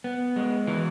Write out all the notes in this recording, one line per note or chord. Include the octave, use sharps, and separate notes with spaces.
B3
G#3
E3